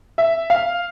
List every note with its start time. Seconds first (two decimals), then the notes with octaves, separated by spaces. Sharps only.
0.18 E5
0.50 F5